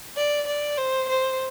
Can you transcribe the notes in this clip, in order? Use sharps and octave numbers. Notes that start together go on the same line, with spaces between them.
D5
D5
C5
C5